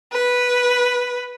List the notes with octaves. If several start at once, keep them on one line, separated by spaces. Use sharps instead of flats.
B4